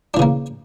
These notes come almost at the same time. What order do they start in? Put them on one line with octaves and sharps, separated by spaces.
D4 E3 C#3 A#3